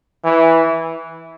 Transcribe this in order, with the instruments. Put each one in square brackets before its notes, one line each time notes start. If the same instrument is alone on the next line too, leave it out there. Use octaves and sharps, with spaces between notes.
[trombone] E3